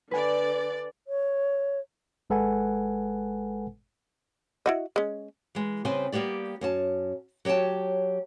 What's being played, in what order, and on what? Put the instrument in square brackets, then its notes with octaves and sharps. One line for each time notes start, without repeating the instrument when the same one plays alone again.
[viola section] D3 D5 [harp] B4 G#5
[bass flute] C#5
[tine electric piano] G#1 G#3 A4 B4 F#5 G#5
[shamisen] E4 F#4 D#5
G#3 C#4
[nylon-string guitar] E3 G#3
C#3 G3 B3 C4 C5 G#5
G3 A#3 B3 G4 D5
F#2 C#4 A5
F#3 G4 C#5 G5 A5